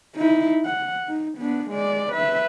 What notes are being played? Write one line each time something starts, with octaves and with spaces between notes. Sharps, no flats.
D#4 E4
F#5
D#4
B3 D4
G#3 D5
B4 E5